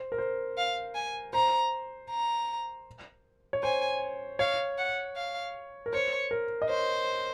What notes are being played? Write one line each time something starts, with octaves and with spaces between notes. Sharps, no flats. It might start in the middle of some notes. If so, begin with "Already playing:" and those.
Already playing: C5
A#4
C5
F5
G#5
C5 A#5
A#5
C#5
C5 G#5
C#5 F5
F#5
F5
A#4
C5 C#5
A#4
D#5
C5 C#5